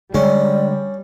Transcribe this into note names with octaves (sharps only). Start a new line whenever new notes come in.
D3 G3 G#3 C#4 D5